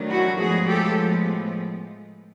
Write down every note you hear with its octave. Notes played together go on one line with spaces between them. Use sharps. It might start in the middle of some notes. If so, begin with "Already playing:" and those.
Already playing: D#3 F#3 A3 D4
E4 F#4
A2 F3 G#3 B3 F#4 G#4
G4 A4